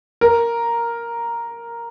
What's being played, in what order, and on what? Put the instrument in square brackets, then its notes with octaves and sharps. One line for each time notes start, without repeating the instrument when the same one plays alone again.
[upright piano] A#4